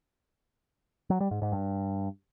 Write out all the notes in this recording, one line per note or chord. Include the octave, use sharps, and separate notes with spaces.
F#3
G3
G#2
G#2
G2